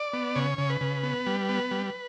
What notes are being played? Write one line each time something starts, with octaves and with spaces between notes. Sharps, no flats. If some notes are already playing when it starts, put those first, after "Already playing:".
Already playing: D5
B3
C#3 C#5
C#3
B4
C#3
B3
G3
B3
G3